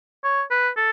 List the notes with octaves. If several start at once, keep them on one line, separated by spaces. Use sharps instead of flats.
C#5
B4
A4